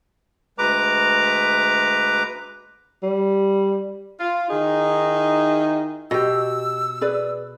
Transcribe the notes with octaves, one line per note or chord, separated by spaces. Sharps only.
D2 G#3 B4 A#5 D6
G3
F4
D#3 D#4 E4 G#4
B2 G4 D#5 E6
G#4 B4 D5